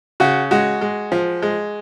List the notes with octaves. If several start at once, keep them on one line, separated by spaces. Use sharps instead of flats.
C#3 F#4
G#3 F#4
G#3
F3
G#3